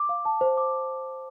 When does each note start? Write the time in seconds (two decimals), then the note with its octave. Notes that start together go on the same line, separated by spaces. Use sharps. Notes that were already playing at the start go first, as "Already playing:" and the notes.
Already playing: D6
0.09 F5
0.25 A5
0.41 C5
0.57 D6